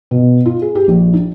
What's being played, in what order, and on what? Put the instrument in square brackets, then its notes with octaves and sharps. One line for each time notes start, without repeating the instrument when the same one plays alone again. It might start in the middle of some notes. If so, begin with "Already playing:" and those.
[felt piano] B2
F4
G#4
G4
A#1
D4